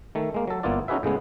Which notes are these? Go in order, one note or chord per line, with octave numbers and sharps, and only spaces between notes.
D#3 A3
G#3 A#3
F#3 A4
G1 A#3 B3 E4 F4 D5
C#4 D#4 F#4 G#4 B4 E5
A2 C#3 G#3 B3